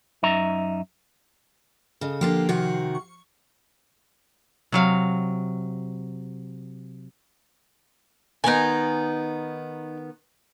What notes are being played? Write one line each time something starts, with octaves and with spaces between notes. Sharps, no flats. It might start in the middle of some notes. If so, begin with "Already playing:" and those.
F#2 D#4 E5 A#5
C#3 A4 D#5
D3 F3 A#3 G4 F6 C7
C3 D#3 F#4
C#6
C3 F#3 F5
D#3 B3 D#4 G#5